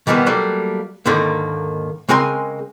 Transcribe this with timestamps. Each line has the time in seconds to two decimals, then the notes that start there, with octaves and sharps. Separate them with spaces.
0.07 B2 D#3 G3 G#3 A#3 B3
0.26 F#3 G3 A3 A#3
1.06 D#2 G#2 D3 D#3 A#3 D#4
2.09 C#3 G#3 C4 A#4 G#5 C6